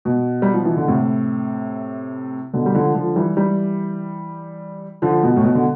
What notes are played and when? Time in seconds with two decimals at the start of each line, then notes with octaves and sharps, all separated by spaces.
0.05 B2
0.42 G3
0.54 F3
0.65 E3
0.77 D3
0.88 A2 C3
2.53 B2 D3
2.66 G3
2.75 D3 F3
2.95 D3 F3
3.16 E3 G3
3.36 E3 G3
5.02 D3 F3
5.23 B2
5.36 A2
5.44 B2
5.55 D3